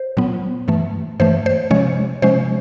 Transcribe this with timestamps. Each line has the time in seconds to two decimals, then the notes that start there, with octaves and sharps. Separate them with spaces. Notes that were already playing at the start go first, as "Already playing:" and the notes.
Already playing: C5
0.17 A#2 F#3 B3
0.68 G2 E3 A3
1.20 G2 E3 A3 C5
1.46 C5
1.71 C3 F3 G#3 C#4 C#5
2.22 C3 F3 G#3 C#4 C5